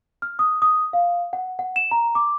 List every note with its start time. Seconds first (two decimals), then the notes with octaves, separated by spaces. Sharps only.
0.22 F6
0.39 D#6
0.62 D#6
0.93 F5
1.33 F#5
1.59 F#5
1.76 E7
1.91 A#5
2.15 D6